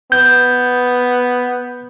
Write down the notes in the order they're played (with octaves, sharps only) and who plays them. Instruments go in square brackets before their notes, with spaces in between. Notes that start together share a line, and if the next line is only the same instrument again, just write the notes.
[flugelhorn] B3 [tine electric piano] G6